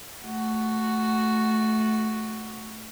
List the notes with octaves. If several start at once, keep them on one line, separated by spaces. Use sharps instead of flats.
A3 F#4